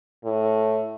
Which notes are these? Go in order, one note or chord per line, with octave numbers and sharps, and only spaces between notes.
A2